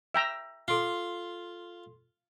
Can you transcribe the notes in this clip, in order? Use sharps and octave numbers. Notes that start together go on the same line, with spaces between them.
E5 G5 A#5
F4 A4 C6 C7